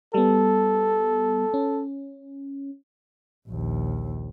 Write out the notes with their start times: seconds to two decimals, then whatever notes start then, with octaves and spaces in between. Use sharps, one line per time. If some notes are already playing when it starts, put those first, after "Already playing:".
0.14 G3 B3 A4
1.54 C#4
3.48 A#1 D#2